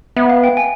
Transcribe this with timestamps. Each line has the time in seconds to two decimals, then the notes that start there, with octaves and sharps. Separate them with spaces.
0.16 B3 E5
0.30 F5
0.44 G5
0.57 G#5